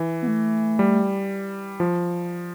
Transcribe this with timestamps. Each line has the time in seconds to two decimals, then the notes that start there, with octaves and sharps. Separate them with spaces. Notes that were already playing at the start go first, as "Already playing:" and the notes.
Already playing: E3
0.22 B3
0.28 A3
0.79 G3
1.80 F3